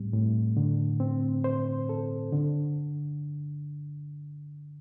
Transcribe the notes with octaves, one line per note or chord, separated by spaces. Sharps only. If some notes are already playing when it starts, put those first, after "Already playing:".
Already playing: A2 G3 C4
A2
D3
C4
C5
A4
D3